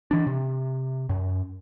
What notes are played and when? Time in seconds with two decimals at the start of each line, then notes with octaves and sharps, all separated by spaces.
0.11 E3 D4
0.27 C3
1.09 F#2